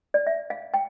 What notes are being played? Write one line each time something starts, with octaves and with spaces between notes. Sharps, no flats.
D5
E5
F5
G5